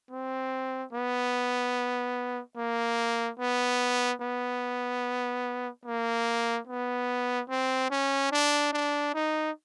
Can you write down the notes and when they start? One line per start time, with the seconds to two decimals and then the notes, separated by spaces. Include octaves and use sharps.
0.11 C4
0.93 B3
2.57 A#3
3.39 B3
4.21 B3
5.85 A#3
6.67 B3
7.49 C4
7.90 C#4
8.32 D4
8.72 D4
9.14 D#4